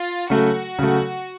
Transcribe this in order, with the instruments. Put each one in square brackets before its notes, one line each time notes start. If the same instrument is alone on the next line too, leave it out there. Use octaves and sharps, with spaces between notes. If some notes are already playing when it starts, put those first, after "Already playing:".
Already playing: [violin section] F4
[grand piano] C#3 F#3 A3 [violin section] F#4
[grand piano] C#3 F#3 A3